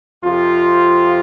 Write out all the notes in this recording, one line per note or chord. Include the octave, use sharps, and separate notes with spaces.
F2 C3 F3 F4